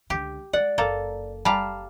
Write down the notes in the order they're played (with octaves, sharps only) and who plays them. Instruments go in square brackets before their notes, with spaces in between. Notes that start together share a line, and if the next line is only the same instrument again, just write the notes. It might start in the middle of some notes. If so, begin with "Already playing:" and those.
[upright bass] C#2 D3 [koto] G4
[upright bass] G#3 [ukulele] D5 [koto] F#5
[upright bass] F#1 [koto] A#3 A4
[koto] G3 F5 [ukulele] A5 A#5